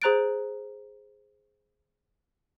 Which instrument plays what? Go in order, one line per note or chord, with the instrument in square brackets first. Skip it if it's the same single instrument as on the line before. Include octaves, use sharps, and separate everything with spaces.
[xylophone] G#4 C5 A#5 F#6 A6 D7